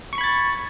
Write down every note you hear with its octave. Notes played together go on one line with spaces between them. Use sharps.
B5 C#6 G#6 A6 C#7